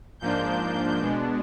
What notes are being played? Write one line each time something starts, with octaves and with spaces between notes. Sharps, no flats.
G#2 F3 A#3 D4 G6
B2 G#3 B3 D4